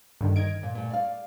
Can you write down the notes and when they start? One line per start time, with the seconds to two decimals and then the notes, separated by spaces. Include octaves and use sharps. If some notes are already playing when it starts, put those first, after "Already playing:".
0.21 G2 D3 D#3
0.36 A#4 D#5 G#6 D7
0.63 A#2
0.75 A#2 A3
0.90 D5 F5